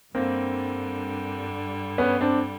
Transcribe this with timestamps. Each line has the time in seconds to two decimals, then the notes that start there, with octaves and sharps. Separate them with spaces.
0.14 G2 D3 G3 A#3 C4
1.98 B3 C#4
2.21 C4 D4